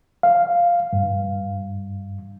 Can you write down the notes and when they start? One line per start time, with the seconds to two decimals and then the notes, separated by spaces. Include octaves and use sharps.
0.23 F5
0.93 G2